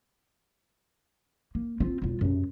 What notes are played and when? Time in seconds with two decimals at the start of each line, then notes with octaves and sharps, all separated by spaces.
1.55 A#3
1.80 C4 F4
2.02 E1 F4
2.21 F#2 C3